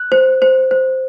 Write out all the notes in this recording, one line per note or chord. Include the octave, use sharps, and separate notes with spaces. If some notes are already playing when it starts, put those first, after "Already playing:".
Already playing: F#6
C5
C5
C5